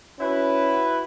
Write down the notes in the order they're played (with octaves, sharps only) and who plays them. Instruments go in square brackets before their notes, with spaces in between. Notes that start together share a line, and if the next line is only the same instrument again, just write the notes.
[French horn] C#4 [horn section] E4 F#4 B4